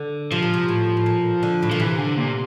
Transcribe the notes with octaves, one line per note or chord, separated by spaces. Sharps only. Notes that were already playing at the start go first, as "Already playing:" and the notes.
Already playing: D3
C3 F3
A#2
C3
A2
A2
A#2
D3
A2
A#2 F3
C3 E3
D3
A#2